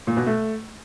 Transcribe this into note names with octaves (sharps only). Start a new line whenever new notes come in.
A#2
B2
A3